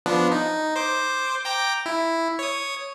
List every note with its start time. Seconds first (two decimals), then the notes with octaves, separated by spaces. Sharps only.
0.06 F3 B3 D4
0.32 D#4
0.76 C5 D6
1.45 G5 A#5 D6
1.86 E4
2.39 C#5 D#6